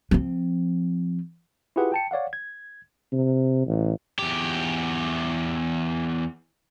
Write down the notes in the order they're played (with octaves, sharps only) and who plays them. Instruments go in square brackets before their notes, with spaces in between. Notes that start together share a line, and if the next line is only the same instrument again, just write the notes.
[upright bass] F3 C4
[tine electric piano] E4 F4 G4 G#4 B4 F#5
G5 A5 C#7
C#5 D5 F5 F#5
G#6
[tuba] C3
A1
[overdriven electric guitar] E2 G4